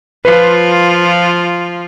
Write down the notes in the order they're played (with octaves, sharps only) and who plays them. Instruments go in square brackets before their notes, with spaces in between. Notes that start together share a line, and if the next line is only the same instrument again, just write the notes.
[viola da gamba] F3 F4 [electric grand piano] B4